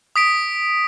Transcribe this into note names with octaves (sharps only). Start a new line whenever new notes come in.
D#6 B6 D7